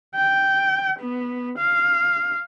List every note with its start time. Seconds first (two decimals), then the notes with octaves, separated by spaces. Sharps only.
0.15 G5
1.00 B3
1.58 F5